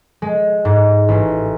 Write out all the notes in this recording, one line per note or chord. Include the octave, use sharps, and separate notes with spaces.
G#3
G#2
A1